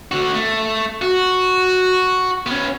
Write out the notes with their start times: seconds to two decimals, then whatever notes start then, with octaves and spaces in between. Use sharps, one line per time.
0.12 D3 F#4
0.34 A3
1.02 F#4
2.47 B3 C#4